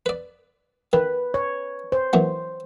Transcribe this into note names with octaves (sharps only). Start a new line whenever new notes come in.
B4 D5
D#3 B4
C#5
C5
A#2 E3 F#3